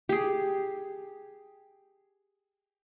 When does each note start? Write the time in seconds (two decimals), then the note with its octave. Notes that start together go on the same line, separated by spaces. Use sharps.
0.09 G4 G#4